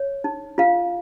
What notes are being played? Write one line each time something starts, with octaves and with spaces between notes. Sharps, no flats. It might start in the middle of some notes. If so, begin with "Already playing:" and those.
Already playing: C#5
D#4
F4 F5